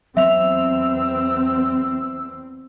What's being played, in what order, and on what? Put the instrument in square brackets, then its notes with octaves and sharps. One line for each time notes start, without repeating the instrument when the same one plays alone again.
[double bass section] E2 C4 [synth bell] F#3 F7 [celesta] E5 [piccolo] E6